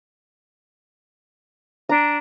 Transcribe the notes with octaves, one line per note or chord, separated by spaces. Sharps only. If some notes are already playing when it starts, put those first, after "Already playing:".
D4 A#5